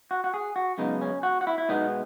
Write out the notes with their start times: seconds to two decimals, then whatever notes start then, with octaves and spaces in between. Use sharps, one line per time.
0.11 F#4
0.24 F#4
0.34 G#4
0.56 F#4
0.78 F#2 C#3 G#3 B3 D#4
1.02 C#4
1.23 F#4
1.41 F#4
1.47 E4
1.58 E4
1.69 B2 G#3 B3 D#4